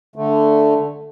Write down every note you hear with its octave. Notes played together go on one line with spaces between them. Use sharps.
D3 A3